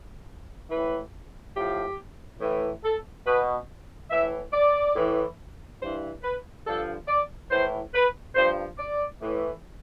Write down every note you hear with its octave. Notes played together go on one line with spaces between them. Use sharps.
A2 E3 B4
A2 F3 G4
A2 E3
A4
B2 B4
A2 E3 E5
D5
A2 E3
G2 E3 C5
B4
G2 D3 F3 A4
D5
A2 E3 C5
B4
G2 F3 C5
D5
A2 E3